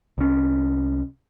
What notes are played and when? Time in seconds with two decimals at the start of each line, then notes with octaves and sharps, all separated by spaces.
0.18 C2 C#4